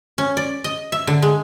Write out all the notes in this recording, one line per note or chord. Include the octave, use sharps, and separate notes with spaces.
C#4
D5
D#5
E5
D3
G#3